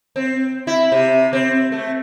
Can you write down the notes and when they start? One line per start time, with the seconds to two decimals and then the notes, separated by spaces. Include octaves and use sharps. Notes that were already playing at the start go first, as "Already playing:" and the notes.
0.16 C4
0.67 E4
0.92 C3
1.33 C4
1.72 A3